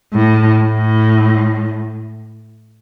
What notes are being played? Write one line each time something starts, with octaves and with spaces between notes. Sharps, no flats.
A2
A2